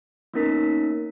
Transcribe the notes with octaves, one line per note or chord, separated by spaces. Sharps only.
A#3 B3 C#4 D#4 A#4 B6